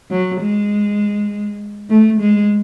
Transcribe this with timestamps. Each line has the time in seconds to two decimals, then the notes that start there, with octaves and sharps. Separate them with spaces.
0.11 F#3
0.41 G#3
1.89 A3
2.20 G#3